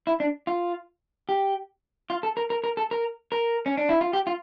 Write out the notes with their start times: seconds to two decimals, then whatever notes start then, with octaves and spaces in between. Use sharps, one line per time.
0.07 E4
0.20 D4
0.47 F4
1.29 G4
2.10 F4
2.23 A4
2.37 A#4
2.50 A#4
2.64 A#4
2.77 A4
2.91 A#4
3.32 A#4
3.66 C#4
3.77 D4
3.89 E4
4.01 F4
4.13 G4
4.27 F4